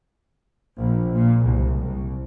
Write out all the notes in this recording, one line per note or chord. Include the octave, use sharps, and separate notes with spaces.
A#1 A#2
A#2
F#1 C2
C2